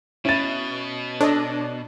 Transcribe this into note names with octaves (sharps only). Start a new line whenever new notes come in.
B2 C#4 E4 A6
D4 A4 C#5 D#5